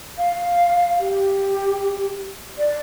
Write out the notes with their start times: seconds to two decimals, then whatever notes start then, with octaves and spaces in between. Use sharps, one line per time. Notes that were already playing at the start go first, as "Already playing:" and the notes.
0.18 F5
0.99 G4
2.58 D5